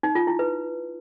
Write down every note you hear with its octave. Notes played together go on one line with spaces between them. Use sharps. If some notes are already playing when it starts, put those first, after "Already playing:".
D#4
F4
E4
B4